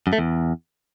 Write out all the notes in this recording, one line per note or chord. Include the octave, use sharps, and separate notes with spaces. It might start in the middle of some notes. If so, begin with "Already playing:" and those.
F#2
A3
E2